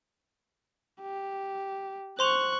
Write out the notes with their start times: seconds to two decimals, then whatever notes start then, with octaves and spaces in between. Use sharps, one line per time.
1.01 G4
2.19 C5 C6 C#6 F#6 F7